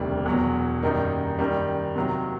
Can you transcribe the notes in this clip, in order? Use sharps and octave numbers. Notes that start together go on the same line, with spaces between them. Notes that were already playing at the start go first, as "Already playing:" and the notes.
Already playing: E1 D2 C3 D#3 G3
E2 B2 F#3
F#2 D#3 G3 A#3 D#4
F#2 D#3 G3
C3 D#3 F#3 A#3